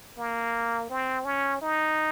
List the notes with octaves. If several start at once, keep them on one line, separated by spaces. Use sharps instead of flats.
A#3
C4
C#4
D#4